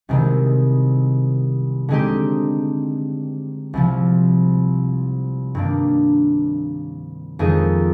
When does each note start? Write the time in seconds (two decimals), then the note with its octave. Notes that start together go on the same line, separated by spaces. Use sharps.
0.09 C2 C3 D#3 G#3
1.89 D3 G#3 C4 D#4 G4
3.74 C2 C3 F3
5.55 G2 D#3 A#3 D4
7.39 F2 D#3 G#3 D#4 G#4